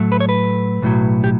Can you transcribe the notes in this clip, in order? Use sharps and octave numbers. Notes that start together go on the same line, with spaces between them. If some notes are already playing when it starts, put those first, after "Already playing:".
Already playing: A2 F#3 A3
B4
C#5
B4
B1 A2 F#3
G4